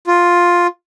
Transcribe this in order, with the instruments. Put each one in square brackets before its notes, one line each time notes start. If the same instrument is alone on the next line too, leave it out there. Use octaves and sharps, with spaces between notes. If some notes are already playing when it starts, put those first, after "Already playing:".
[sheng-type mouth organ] F4